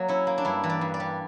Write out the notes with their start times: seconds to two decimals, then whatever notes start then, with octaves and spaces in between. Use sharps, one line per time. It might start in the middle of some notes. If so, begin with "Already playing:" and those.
Already playing: F#3 A#3
0.08 C#4 E4
0.27 A#3
0.38 D4
0.45 G2 E4
0.64 E3
0.69 D5
0.81 G2
0.94 D5
1.00 G3